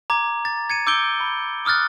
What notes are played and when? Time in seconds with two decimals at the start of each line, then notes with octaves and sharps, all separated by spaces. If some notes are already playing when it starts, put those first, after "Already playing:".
0.10 A#5 D6 G#6
0.45 A6
0.70 G#6 C#7 D#7
0.87 D6 E6 G6 C#7 D7 G7
1.20 B5
1.65 D6 D#6 F6 F#6 A6